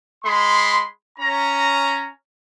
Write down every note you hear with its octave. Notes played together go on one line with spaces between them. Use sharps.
G#3 B5 C6
C#4 A#5